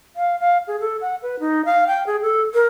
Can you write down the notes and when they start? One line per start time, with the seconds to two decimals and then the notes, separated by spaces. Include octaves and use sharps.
0.16 F5
0.40 F5
0.68 G#4
0.80 A4
1.01 F#5
1.22 B4
1.40 D#4
1.65 F5
1.87 G5
2.07 G#4
2.22 A4
2.54 A#4